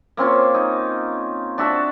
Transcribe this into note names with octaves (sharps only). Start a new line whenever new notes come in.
A#3 C4 C#4 F4
D#4
D4 F#4 E5 A5